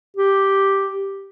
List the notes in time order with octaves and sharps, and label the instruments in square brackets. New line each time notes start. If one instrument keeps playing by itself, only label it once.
[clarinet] G4